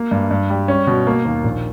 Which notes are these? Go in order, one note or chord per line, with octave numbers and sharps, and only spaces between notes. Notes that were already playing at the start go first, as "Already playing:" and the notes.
Already playing: A#3
G2
G2
G3
C#4
B2
A#3
D#2
A#1